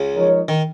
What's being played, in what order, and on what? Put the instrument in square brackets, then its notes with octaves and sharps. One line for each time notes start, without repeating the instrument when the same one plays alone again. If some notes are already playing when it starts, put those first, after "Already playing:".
Already playing: [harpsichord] C#2 C#3
[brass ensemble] F3 G#3 D#4 A#4 C#5
[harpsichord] D#3